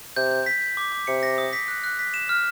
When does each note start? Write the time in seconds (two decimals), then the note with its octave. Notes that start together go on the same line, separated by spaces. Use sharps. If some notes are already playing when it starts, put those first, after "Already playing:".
0.16 C3 G6
0.31 G6
0.46 B6
0.62 G6
0.77 D6
0.92 D6
1.07 C3 C#7
1.23 A#6
1.38 D#6
1.53 B6
1.68 F#6
1.84 F#6
1.99 B6
2.14 E7
2.29 F6